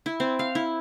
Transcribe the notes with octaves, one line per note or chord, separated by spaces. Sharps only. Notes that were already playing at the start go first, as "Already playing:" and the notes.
E4
C4
F5
E4